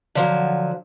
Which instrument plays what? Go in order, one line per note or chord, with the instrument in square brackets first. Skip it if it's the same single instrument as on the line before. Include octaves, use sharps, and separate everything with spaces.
[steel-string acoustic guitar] D3 F3 F#3